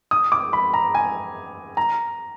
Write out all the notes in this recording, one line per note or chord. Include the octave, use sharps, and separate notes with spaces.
D#6
D6
B5
A#5
G#5
A#5